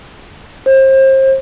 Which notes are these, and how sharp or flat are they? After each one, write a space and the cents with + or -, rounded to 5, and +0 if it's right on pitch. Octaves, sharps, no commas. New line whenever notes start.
C5 +30